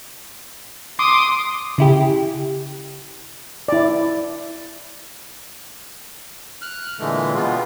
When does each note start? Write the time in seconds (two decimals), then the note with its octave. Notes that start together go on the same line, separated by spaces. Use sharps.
0.99 C6 D6 D#6
1.78 C#3 E4 G4
3.68 E4 D5
6.62 F6 F#6
7.00 A#2 D3 E3 G#3 A3
7.34 B2 G3 G#3 B3 F4